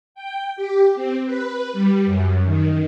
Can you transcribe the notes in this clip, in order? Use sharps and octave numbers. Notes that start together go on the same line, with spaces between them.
G5
G4
C4
B4
G3
F#2
D#3